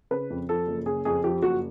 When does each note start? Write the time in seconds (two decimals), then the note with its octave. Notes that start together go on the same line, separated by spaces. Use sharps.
0.11 C#3 B4
0.30 F2
0.49 F3 A4
0.67 F#1
0.86 C#3 G#4
1.05 F2 G#4
1.24 F3 G4
1.42 F#1 F#4